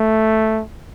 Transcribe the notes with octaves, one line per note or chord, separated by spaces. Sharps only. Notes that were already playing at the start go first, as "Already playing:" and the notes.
Already playing: A3